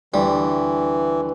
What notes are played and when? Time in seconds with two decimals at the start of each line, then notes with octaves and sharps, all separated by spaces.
0.14 D2 E3 G3